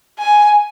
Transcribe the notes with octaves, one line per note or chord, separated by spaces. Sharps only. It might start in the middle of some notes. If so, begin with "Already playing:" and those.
G#5